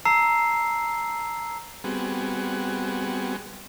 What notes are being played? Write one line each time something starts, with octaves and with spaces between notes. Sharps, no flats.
A5 A#5 E6 C7
G3 B3 C4 F#4 G#4